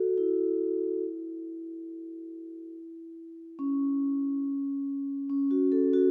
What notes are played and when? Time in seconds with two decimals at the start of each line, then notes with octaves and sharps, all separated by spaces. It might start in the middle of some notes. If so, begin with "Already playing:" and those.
Already playing: F#4 A4
0.18 E4
3.59 C#4
5.29 C#4
5.51 F#4
5.72 A4
5.93 F#4